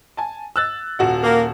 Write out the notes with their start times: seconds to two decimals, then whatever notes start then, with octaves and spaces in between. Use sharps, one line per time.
0.17 G#5 A5
0.56 E6 F#6 A6
0.99 D#1 F#4 F#5
1.24 A#3